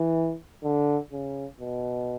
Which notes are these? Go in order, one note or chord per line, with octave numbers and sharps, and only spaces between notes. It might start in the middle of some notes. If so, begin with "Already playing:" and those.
Already playing: E3
D3
C#3
B2